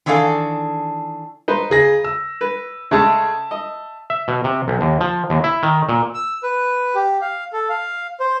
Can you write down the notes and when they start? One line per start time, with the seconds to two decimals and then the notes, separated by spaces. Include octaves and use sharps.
0.06 D#3 E3 D4 G#4 A4 F5
1.48 D#4 B4 C5
1.70 C#3 G#4 A#6
2.04 E6
2.41 B4
2.91 C#3 G#3 A3 E5 A5 E6
3.51 D#5
4.10 E5
4.28 B2
4.44 C3
4.68 B1
4.81 D#2
5.01 F3
5.30 D#2
5.44 E4
5.63 D#3
5.89 A#2
6.15 E6
6.43 B4
6.95 G4
7.21 F5
7.53 A4
7.69 F5
8.20 C5